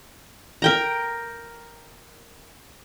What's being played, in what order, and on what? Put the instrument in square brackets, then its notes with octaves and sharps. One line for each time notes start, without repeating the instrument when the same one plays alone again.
[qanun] A#4 G5 A#5